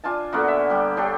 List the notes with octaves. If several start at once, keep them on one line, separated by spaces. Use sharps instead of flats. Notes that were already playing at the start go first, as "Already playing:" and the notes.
D4 F4 G#5 A5
D3 A#3 B3 F#4
E5
G3 G4
D4 G4 A4 C#5